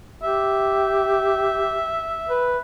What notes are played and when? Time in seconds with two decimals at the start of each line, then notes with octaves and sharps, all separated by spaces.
0.23 G4 E5
2.29 B4